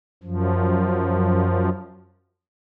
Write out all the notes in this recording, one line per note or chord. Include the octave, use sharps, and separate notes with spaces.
F#2 F3